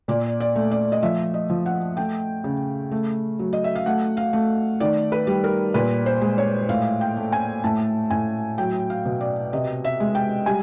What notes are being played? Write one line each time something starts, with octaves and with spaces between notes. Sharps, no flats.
A#2 D5
D5
A3
D5
D#5
F3 E5
D#5
F3
F#5
A3 G5
C#3
A3
F#3
D#5
E5
F5
A3 F#5
F5
A3
D#3 D5
B4
G3
A#4
A#2 B4
C5
G#3
C#5
A2 F5
G5
A3
G#5
A2 A5
A2 G#5
F#3 G5
F5
B2
D5
C3 D#5
E5
G#3
G5
G3 G#5